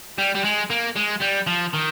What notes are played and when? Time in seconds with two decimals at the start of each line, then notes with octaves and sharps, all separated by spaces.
0.18 G3
0.35 G3
0.44 G#3
0.70 A#3
0.96 G#3
1.22 G3
1.47 F3
1.73 D#3